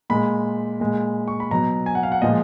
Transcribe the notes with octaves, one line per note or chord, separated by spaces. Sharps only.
A#2 G#3 B5
A#2 G#3
C#6
B5
B2 F#3 A#5
G#5
F#5
F5
F#5
A#2 F3 G#3 D#5